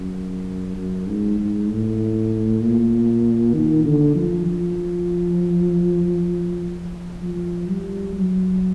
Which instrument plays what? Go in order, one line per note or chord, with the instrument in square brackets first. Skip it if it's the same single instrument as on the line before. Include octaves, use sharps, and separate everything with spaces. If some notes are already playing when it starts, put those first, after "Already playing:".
Already playing: [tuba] F#2
F#2
G#2
G#2
A2
A#2
D#3
D3
F3
F3
F3
G3
F#3